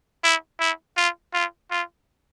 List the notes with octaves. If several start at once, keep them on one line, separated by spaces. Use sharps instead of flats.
E4
E4
F4
F4
F4